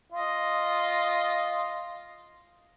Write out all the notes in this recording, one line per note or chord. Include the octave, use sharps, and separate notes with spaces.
F4 D#5